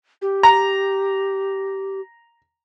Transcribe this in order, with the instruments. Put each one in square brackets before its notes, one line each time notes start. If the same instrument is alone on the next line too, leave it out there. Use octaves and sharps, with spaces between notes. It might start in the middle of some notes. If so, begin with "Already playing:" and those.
[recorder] G4
[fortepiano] A#5